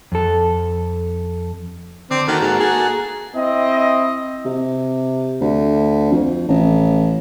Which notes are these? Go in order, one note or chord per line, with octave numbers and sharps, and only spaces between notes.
F2 A4
D3 C4 D6
D#3 A#3 F#4 A4
G#2
G#4
C4 E4 D#5
C3
D2
F2
A1